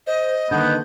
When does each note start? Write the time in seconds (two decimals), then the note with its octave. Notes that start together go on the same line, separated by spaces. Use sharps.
0.07 C5 D#5
0.51 D3 D#3 A#3 B3 G6